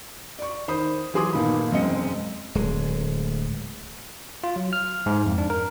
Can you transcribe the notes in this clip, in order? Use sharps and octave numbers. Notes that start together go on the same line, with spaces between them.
D5 C#6
D#3 C5 B5 D#6
E3 F#3 G#4 C6 D6 D#6
G1 A#2 D#3 B5
E1 F#2 G#3 C4 D#5 C#7
D1 G#3
F4
F#3
F6
G#2
F2
D4
A#4